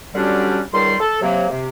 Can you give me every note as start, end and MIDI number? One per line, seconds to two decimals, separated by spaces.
0.15 0.60 50
0.15 0.60 54
0.15 0.60 55
0.15 0.60 61
0.15 0.60 62
0.15 0.60 67
0.73 0.94 37
0.73 0.94 51
0.73 0.94 55
0.73 0.94 84
1.00 1.18 69
1.22 1.45 48
1.22 1.45 54
1.22 1.45 58
1.50 1.69 48